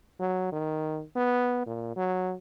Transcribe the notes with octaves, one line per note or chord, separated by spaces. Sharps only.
F#3
D#3
B3
A#2
F#3